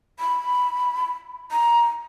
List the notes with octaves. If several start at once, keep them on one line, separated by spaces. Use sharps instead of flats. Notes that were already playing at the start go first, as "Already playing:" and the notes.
B5
A#5